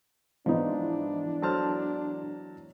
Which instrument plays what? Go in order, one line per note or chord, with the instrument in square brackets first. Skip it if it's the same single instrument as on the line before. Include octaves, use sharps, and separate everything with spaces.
[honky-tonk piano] G#2 E3 B3 [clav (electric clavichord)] F3 D#4 [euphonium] D4
[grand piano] F#3 A5 F6 [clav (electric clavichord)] A4 C5